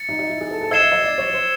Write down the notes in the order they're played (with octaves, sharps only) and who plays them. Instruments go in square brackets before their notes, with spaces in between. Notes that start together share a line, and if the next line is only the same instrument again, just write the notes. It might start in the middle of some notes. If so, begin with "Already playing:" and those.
Already playing: [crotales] A6 C#7
[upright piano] D#4
D#4
E4
G#4
A4
A4
[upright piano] D#5 [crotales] E6 G#6 C7 E7 G7
[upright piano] E5
D#5
D5
C#5
C5